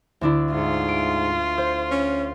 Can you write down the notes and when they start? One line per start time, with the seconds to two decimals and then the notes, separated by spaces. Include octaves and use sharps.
0.21 D2 D4 E4
0.53 G#2 F4
0.89 D7
1.58 C5
1.91 C#4